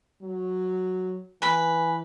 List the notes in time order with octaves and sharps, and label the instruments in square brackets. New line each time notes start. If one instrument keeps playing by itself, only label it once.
[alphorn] F#3
[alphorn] E3 [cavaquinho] B4 B5 [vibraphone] G#5